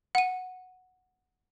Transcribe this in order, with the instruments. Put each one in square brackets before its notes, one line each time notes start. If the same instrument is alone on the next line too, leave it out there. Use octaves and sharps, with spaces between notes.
[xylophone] F#5 D#7